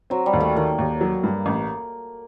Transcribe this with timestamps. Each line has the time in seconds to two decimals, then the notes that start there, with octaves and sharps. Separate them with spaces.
0.10 F#3 C4
0.26 G3
0.33 D#2
0.40 A3
0.56 D#3 A#3
0.78 D#2
1.01 F#3
1.24 G2
1.46 A1